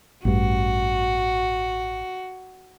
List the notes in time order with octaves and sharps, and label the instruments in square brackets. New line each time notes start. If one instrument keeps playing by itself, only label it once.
[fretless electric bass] A1 G2 [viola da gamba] F#4